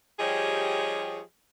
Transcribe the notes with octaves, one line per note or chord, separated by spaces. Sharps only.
F3 G3 G4 G#4 C#5 D#5